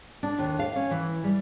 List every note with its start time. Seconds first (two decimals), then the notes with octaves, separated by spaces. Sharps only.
0.23 D4
0.39 D#2
0.59 F5
0.76 C#4
0.91 E3
1.24 G3